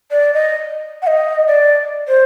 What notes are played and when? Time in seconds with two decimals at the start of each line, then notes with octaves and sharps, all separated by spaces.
0.11 D5
0.33 D#5
1.02 F#5
1.06 D#5
1.47 D5
2.08 C5